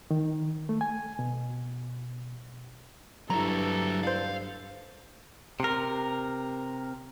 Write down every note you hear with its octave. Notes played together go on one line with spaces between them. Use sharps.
D#3
A3
G#5
B2
G2 F#3 E4 A4 A#5
C5 D5 F5
C3 A#4